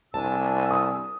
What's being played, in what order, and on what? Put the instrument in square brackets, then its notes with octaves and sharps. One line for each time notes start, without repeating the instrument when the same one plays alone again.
[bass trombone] C2 [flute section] D4 G#5 E6 [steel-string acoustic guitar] A5
[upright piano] D#6